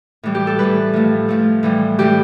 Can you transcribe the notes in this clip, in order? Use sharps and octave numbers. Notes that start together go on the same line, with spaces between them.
A2 E3 G3
G4
A4
A2 E3 G3 B4
A2 F3 A3
A2 F3 A3
A2 E3 G3
A2 E3 G3 G4